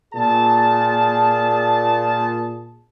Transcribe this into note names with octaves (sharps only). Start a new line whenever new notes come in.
A#2 G#4 A5